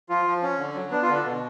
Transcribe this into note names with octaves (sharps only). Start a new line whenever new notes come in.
F3 F4
F3
C#4
D3
F#3
B3 D4
D3 F4
D4
B2